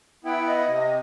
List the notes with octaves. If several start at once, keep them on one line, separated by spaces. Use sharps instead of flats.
B3 E4 G5
D#5
C3